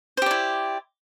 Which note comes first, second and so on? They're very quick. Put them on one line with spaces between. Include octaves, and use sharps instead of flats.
C5 G4 D5 E4